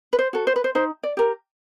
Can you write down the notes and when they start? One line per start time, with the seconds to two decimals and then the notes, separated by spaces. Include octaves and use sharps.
0.13 B4
0.19 C5
0.33 F#4 A4
0.47 C5
0.56 B4
0.64 C5
0.75 D#4 C5
1.03 D5
1.17 G4 A#4